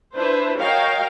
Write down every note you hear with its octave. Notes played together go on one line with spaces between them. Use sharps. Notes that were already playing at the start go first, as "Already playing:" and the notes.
D4 E4 B4 C5
F#4 A#4 C#5 D#5 F5 G5